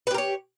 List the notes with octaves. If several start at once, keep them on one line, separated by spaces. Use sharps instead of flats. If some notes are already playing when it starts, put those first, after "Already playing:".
G4 A#4 B4 C#5